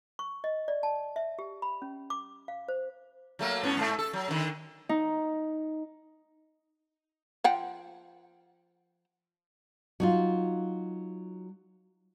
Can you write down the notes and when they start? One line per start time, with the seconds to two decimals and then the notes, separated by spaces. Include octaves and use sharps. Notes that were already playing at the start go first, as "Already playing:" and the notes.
0.19 C#6
0.44 D#5
0.68 D5
0.83 A5
1.16 E5
1.39 G4
1.62 B5
1.82 C#4
2.10 D6
2.48 F5
2.68 C5
3.39 F#3 A3 A#3
3.63 G#2 B3 C#4
3.77 G#2 A3
3.99 A4
4.13 F#3
4.28 D3 D#3
4.89 D#4
7.44 F3 F#5 G5
10.00 F#3 D#4 F4